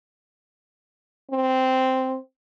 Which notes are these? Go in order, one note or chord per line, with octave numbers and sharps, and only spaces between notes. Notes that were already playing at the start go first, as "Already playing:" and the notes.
C4